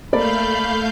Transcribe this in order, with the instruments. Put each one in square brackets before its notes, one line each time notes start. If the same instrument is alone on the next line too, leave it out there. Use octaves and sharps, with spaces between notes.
[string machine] A3 F5 G6 [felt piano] A#3 A4 D5 [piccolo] B5